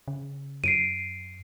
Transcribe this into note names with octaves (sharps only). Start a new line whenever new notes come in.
C#3
F#2 C7 D7 D#7